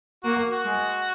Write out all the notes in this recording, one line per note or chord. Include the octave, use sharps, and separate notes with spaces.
A#3 F#4
F#4
G#3